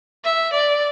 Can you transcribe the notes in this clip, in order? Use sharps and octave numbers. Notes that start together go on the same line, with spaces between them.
E5
D5